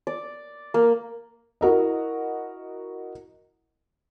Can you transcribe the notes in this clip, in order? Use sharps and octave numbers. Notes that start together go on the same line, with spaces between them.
D5
A#3
E4 F#4 A#4 D#5